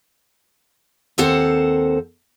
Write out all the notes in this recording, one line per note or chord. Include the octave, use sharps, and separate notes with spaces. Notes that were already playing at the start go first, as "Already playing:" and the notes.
D#2 C4 A4 A#4 C5 F#5